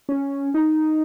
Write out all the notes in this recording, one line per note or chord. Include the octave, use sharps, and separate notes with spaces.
C#4
D#4